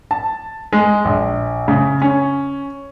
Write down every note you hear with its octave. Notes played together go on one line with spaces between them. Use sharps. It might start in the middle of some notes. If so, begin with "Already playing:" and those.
A5
G#3
A#1
C#3
C#4